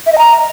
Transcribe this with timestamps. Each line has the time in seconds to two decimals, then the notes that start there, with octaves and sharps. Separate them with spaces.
0.06 E5
0.12 D#5
0.18 A#5